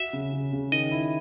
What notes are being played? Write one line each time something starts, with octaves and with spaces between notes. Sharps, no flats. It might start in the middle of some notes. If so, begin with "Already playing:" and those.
Already playing: F#4 E5
C#3
C#3
C#3
D#3 D#5
E4